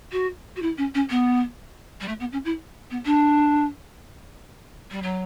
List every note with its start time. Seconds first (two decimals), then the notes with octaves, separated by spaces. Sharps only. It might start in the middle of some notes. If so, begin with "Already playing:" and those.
0.12 F#4
0.56 F#4
0.62 E4
0.77 C#4
0.94 C#4
1.10 B3
2.00 G3
2.08 A3
2.20 B3
2.32 C#4
2.45 E4
2.90 B3
3.05 D4
4.91 G3
5.02 F#3